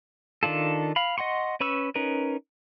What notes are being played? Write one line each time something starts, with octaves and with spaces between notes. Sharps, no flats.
D#3 D4 F4 A4
F5 B5
D#5 F#5 C6 C#6
C#4 B4 B5 C#6 E6
C#4 D#4 A#4 B4